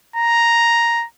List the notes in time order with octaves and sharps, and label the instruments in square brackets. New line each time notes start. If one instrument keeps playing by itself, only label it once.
[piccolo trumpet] A#5